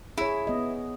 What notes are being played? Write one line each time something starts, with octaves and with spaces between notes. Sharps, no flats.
E4 G#4 C#5
B3 D#5